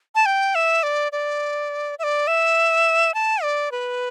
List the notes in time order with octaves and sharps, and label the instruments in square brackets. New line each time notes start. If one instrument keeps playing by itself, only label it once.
[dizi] A5
G5
E5
D5
D5
E5
D5
E5
A5
D5
B4